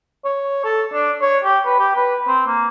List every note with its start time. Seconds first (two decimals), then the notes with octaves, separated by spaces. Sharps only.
0.25 C#5
0.64 A4
0.93 D4
1.22 C#5
1.44 G4
1.66 B4
1.79 G4
1.96 B4
2.28 C4
2.47 A#3